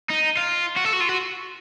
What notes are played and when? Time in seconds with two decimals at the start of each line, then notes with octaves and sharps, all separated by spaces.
0.10 D#4
0.37 F4
0.77 F#4
0.85 A4
0.93 F#4
1.00 F4
1.09 F#4